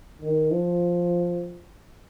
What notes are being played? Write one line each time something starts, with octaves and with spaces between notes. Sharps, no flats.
D#3
F3